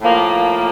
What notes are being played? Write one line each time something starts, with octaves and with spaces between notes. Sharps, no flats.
A2 F3 A#3